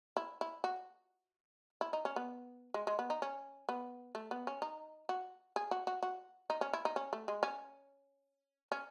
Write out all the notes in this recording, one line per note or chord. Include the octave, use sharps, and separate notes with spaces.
E4
E4
F#4
E4
D#4
C#4
B3
G#3
G#3
B3
D#4
C#4
B3
A3
B3
C#4
D#4
F#4
G#4
F#4
F#4
F#4
D#4
C#4
E4
D#4
C#4
A3
G#3
C#4
C#4